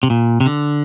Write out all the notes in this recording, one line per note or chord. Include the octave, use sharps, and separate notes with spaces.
C3
A#2
C3
D3